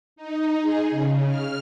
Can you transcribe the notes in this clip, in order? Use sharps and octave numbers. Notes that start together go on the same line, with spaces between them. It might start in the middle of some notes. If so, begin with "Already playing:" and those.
D#4
G#4
C#3
F6